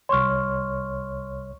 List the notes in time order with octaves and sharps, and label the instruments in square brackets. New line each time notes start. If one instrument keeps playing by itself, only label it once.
[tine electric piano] C2 C#5 [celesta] C6 C#6 F6